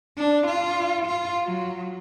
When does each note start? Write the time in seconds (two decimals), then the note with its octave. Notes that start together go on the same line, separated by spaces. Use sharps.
0.18 D4
0.47 F4
1.05 F4
1.44 F#3